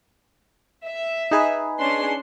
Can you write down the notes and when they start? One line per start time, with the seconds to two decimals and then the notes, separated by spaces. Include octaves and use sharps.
0.86 E5
1.31 D#4 G#4 B4
1.79 C#4 D4 C6